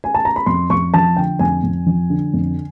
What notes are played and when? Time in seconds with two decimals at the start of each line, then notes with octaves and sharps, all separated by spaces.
0.04 G#5
0.14 A5
0.25 A#5
0.36 B5
0.46 F2 C6
0.70 F2 C#6
0.94 F3 A5
1.17 D3 G5
1.39 F2 G#5
1.63 F2
1.86 F3
2.10 D3
2.33 F2